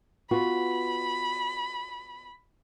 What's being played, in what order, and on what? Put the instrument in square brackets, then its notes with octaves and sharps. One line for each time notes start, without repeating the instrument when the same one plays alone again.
[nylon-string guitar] B3 F4 F#4 [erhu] B5